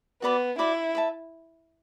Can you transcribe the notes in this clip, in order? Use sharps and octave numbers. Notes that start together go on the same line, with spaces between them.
B3 F#4 D5 B5 D6
E4 F#4 D5 B5 D6
B4 E5 A5